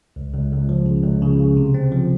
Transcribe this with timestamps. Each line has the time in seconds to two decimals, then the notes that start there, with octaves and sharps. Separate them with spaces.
0.16 C#2
0.33 C#2
0.52 C#2
0.69 F3
0.86 C#3
1.04 C#2
1.22 C#3
1.39 C#3
1.57 C3
1.74 C4
1.92 F3